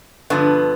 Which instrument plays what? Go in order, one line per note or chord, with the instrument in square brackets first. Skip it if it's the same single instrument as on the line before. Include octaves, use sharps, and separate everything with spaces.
[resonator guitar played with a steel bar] G2 D3 F3 B3